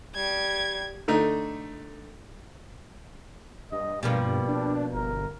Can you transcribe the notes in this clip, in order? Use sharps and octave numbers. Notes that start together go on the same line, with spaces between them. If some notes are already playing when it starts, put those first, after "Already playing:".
G3 G#6
D3 A3 D#4
G2 D#5
B2 F3 G3 A#3
D4
G1 A#4